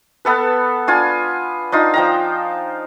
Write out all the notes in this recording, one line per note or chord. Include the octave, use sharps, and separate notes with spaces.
B3 A4 B4
D4 F4 G#5
D4 D#4 F4
F3 G5 A#5